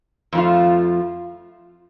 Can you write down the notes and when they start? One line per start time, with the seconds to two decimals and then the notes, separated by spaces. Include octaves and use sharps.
0.33 F2 F3 A3 F4